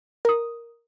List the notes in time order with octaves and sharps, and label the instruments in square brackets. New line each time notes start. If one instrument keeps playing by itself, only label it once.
[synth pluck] A#4 D#6